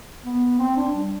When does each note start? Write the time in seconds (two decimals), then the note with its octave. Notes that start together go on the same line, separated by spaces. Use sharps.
0.25 B3
0.59 C4
0.77 D4
0.95 G3